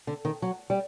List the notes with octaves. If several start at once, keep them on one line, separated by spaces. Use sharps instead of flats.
D3
D#3
F#3
G3